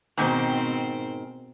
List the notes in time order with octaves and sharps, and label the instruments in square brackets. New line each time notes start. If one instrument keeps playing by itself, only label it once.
[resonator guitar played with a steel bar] G#2 D#3 [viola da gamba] B2 C4 C5